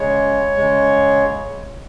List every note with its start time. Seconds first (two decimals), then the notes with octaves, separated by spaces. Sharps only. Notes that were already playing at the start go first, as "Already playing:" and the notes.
Already playing: C#3 G#3 C#5
0.56 C#3 G#3